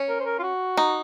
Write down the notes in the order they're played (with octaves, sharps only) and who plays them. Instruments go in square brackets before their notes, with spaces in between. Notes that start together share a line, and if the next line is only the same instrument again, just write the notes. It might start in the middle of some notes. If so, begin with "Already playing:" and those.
Already playing: [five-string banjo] C#4
[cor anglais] A#4
C5
A#4
F4
F#4
[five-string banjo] D#4